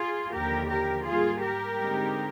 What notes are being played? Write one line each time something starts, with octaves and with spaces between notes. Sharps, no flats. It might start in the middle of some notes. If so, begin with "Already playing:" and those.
Already playing: F4 G#4
D#2 D3 F3 G4 A#4
G4 A#4
G#2 G3 A#3 F4 G#4
G4 A#4
D3 G#3 C4 D#4